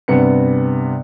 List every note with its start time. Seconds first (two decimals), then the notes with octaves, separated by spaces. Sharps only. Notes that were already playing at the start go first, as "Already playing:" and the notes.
0.08 G2 C3 B3 C#7